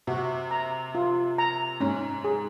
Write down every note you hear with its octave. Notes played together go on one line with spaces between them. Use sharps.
C3 F#4
A#5
F4
A#5
G#2 C#4
G#4